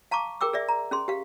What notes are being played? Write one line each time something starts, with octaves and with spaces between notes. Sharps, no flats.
F5 A5 A#5 C#6 D6
G#4 A#4 G5 D6 E6
G#4 D5 E5
A#5
C#4 G#4 C6
G4 F5